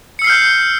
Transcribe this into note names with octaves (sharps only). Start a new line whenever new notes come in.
E6 F6 G6 C7 C#7